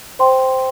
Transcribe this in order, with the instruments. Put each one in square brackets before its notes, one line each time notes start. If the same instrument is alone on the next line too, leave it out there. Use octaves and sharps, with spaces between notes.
[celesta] C5 G5 C6